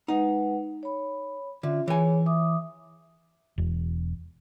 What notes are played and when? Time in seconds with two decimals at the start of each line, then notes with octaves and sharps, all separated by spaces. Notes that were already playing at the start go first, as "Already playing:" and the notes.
0.08 G#3 D#4 B4 F#5
0.83 C#5 B5
1.63 D3 C#4 F4 E5
1.88 E3 G#4 C#5 G#5
2.26 E5 D6 D#6
3.58 E1